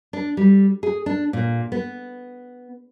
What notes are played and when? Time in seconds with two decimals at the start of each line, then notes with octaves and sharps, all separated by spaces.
0.13 D4
0.37 G3
0.83 G#4
1.06 D4
1.33 A#2
1.72 B3